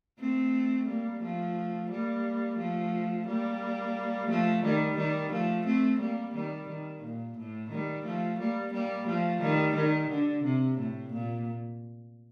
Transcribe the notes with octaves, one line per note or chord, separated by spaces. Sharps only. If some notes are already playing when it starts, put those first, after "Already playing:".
A3 C4
G3 A#3
F3 A3
G3 A#3
F3 A3
G3 A#3
F3 A3
D#3 G3
D#3 G3
F3 A3
A3 C4
G3 A#3
D#3 G3
D#3
A#2
A2
D#3 G3
F3 A3
G3 A#3
G3 A#3
F3 A3
D#3 G3
D#3
D3
C3
A2
A#2